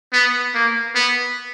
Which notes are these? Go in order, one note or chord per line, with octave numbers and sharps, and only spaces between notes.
B3
A#3
B3